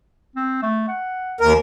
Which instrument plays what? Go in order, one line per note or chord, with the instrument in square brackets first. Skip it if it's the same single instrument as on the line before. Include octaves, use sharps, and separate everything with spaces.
[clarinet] C4
A3
F#5
[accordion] D#2 A#4